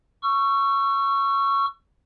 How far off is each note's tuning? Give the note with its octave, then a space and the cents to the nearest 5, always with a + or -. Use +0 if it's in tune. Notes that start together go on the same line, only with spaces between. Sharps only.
C#6 +0 E6 +35